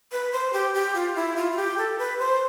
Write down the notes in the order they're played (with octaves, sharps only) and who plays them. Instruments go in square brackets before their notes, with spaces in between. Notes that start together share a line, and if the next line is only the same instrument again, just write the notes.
[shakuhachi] B4
C5
G4
G4
F4
E4
F4
F4
G4
A4
B4
C5